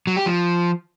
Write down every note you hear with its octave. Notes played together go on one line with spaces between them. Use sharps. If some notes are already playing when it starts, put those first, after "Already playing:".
F#3
G4
F3